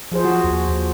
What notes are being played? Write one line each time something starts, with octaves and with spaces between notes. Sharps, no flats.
F3 G#4 C5
F3 F#4
D#2
D#2